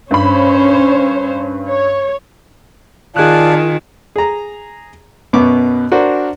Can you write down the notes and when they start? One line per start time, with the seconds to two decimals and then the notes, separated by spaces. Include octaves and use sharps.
0.11 G2 C#4 C5 C#5 B5
1.67 C#5
3.16 D#3 F4 G#4 D5 F5 A5 F#6
4.16 G#4 A#5
5.33 F#2 B2 B3 C#6 D6
5.92 D4 F#4 A#4 C5